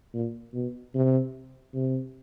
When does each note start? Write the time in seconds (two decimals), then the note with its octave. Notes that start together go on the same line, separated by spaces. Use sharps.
0.14 A#2
0.54 B2
0.95 C3
1.74 C3